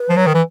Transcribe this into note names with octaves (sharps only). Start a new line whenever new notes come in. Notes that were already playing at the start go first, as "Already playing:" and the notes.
Already playing: B4
F3
F#3
D#3
E3